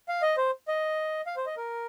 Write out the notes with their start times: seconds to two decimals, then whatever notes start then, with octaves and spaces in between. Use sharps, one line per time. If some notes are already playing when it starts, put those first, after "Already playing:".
0.09 F5
0.22 D#5
0.37 C5
0.68 D#5
1.27 F5
1.37 C5
1.46 D#5
1.57 A#4